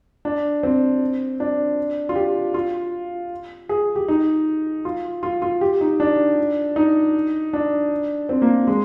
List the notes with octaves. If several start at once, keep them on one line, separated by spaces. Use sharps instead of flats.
D4
C4
D4
F4
G4
F4
G#4
G4
D#4
F4
F4
F4
G4
D#4
D4
D#4
D4
C4
A#3
G#3